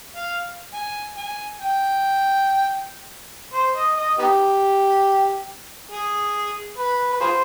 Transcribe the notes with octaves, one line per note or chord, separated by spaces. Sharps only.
F5
G#5
G#5
G5
C5
D#5
D#5
B3 D#4 G4
G#4
B4
B4
F4 G#4 C5